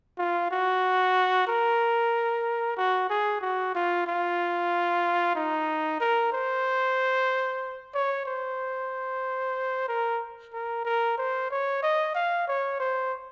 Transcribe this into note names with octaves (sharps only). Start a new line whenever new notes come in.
F4
F#4
A#4
F#4
G#4
F#4
F4
F4
D#4
A#4
C5
C#5
C5
A#4
A#4
A#4
C5
C#5
D#5
F5
C#5
C5